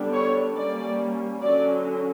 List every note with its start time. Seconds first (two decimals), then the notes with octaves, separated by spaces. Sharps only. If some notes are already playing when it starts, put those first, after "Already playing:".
Already playing: D3 G3 B3 D4
0.13 C#5
0.55 G3 A#3 C#4 D5
1.42 D3 F#3 C#4 D5